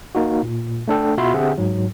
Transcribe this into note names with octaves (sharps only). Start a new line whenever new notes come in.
A#3 D#4 F#4
A#2
A3 D4 A4 G5
B2 F4 F#4 E5 B5 C6
D3 C4 G4 G#4 E5 F#5
G#2 F#3